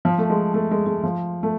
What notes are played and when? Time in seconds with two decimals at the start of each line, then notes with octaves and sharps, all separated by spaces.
0.05 F3
0.18 A3
0.30 G#3
0.54 A3
0.71 G#3
0.86 G#3
1.04 F3
1.43 A3